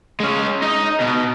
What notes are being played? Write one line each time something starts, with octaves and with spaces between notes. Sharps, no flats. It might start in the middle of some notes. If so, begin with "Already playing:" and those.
G#3 C#4
D#4 D#5
B2